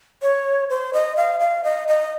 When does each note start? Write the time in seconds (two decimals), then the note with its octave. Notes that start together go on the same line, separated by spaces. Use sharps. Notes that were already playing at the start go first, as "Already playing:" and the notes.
0.22 C#5
0.70 C5
0.93 D#5
1.17 F5
1.40 F5
1.64 D#5
1.88 D#5